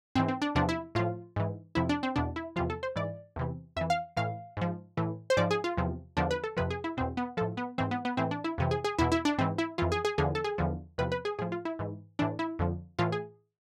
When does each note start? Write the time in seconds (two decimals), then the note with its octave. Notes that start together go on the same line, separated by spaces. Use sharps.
0.15 G#2 E3 C4
0.28 C4
0.42 D4
0.55 E2 C3 F3 D4
0.69 E4
0.95 A2 F3 F4
1.36 G#2 E3
1.75 F2 C3 F3 E4
1.89 D4
2.03 C4
2.16 E2 B2 D4
2.36 E4
2.56 E2 C3 F3 F4
2.70 A4
2.83 C5
2.96 G#2 E3 D5
3.36 E2 C3 E3
3.76 F2 E5
3.81 E3
3.90 F5
4.17 A2 E3 F5
4.57 G#2 F3
4.97 A2 E3
5.30 C5
5.37 G#2 F3 D5
5.51 G#4
5.64 F4
5.77 E2 C3 F3
6.17 E2 D3 F3 D4
6.31 B4
6.44 A4
6.57 F2 C3 F3 B4
6.70 G#4
6.84 E4
6.97 B2 C4
7.00 E2
7.17 B3
7.37 F3 A4
7.41 A2
7.57 B3
7.78 G#2 E3 C4
7.91 B3
8.05 B3
8.17 A2 E3 C4
8.31 D4
8.44 E4
8.58 F2 C3 E3
8.71 G#4
8.84 G#4
8.99 E2 B2 E4
9.12 E4
9.25 D4
9.38 G#2 E3 C4
9.58 E4
9.78 F2 E3 F4
9.92 G#4
10.05 G#4
10.18 E2 D3 F3 G#4
10.35 A4
10.44 G#4
10.58 E2 D3 F3
10.98 E2 C3 F3 B4
11.12 B4
11.25 G#4
11.39 A2 G#4
11.42 F3
11.52 F4
11.65 E4
11.79 G#2 E3
12.19 A2 E3 D4
12.39 E4
12.59 F2 D3 F3
12.99 A2 E3 F4
13.12 G#4